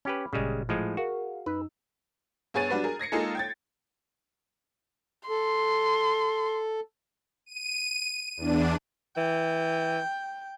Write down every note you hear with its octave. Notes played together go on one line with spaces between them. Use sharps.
C#4 G4 B4 B5 D6 F6
G1 A#2 C#3 G3 G#3
A2 F3 G#3
F#4 G#4 A#4 F5
F#2 D#4 B4 E6
G2 B3 G#4 C#5 A6 D#7
G3 D4 F#4 B4
G#4 A#4
G#6 A#6 C7 C#7
G#3 A#3 D#4 F4 G#4 A4
G5 G#6 A6
A4 C6
D#7
E2 D4
E3 G5